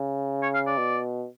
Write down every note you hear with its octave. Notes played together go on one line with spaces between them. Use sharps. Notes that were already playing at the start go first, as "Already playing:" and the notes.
Already playing: C#3
C#5
F5
D5
B2